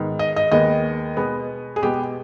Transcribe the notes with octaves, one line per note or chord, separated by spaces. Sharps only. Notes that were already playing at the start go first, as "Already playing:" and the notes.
Already playing: G#2 D#3 B3
D#5
D#5
D#2 D#3 G#3 B3 D#5
B2 G#3 B3
G#4
B2 G#3 B3 G4